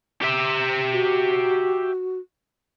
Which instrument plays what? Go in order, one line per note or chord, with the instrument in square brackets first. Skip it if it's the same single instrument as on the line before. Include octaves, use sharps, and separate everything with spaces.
[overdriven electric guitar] G4 E5
[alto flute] F#4